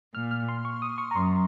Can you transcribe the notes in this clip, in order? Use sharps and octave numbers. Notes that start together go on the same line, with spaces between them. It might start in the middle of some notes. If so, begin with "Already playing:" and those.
A#2 F6
F6
C6
C#6
D#6
C#6
A#5
F#2 C6